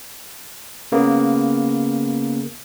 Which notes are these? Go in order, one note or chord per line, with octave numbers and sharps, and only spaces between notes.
C#3 A#3 B3